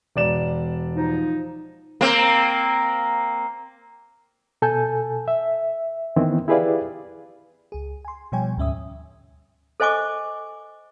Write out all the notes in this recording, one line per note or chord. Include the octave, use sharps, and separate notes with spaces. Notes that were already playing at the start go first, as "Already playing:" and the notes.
E1 D5 E7
F3 D#4
A#3 C4
B2 A4 G#5 A5 G6
E5
D#3 E3 B3 C4 E4
E4 G4 G#4 B4 D5 F5
C#2 G#4
G#5 C6
B2 F3 G3 C#5 G5 G#5
D2 G#2 C#4 E5 D#6
A4 C5 D#5 G#5 C#6 D6